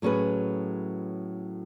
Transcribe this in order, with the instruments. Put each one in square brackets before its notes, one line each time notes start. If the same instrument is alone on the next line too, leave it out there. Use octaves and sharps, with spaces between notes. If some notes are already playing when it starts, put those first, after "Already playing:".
[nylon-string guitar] A2 F#3 C#4 G#4 B4